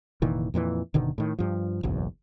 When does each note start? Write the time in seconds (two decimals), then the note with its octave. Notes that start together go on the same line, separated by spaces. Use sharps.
0.22 F1 A#2 D#3 E3
0.54 F2 A#2 D#3 E3
0.94 F#1 B2 D3 D#3
1.18 A2 D#3
1.39 G2 F3
1.83 F#1 B1 E2